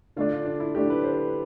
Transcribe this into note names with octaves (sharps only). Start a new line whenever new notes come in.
D3 A3 D4 F4
F4
D4
E4
D3 A3 D4 G4
B4
C5
B4